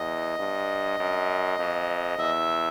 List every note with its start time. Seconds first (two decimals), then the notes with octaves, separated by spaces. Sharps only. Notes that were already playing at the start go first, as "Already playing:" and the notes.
Already playing: E2 D#5
0.39 G2
0.99 F#2
1.59 F2
2.18 E2 E5